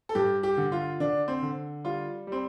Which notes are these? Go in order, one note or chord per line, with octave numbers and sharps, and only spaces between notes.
A4
G2 G4
G4
D3
F4
D3 D4
C4
D3
G3 F4
G3 C4